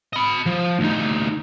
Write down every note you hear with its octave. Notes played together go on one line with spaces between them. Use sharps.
D#5 B5
F3
D2 D#4